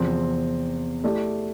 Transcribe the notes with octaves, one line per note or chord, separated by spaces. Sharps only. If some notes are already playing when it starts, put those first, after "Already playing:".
Already playing: E2 C3 F3 C4
A3 E4 G4 D5